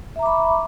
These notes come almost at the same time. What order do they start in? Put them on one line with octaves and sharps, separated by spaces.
E5 A#5 D6 B5 C#6